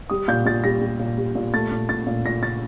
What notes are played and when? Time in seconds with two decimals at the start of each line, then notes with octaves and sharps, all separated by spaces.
0.10 G3 D#6
0.28 A#2 G6
0.45 A#2 A6
0.64 G3 A#6
0.81 G3
0.99 A#2
1.18 G3
1.35 A#2
1.54 A3 A6
1.71 A#2
1.89 A#2 A6
2.07 A#2
2.25 A#2 A#6
2.43 A#2 A6